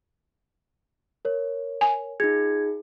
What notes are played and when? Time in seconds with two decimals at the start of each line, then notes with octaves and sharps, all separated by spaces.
1.25 A#4 C#5
1.81 G#5
2.20 D#4 F4 G#4 G#6